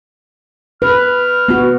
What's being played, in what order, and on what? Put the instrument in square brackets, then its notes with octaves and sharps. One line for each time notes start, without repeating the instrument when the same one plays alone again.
[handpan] B4 [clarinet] F6
[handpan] B3 F#4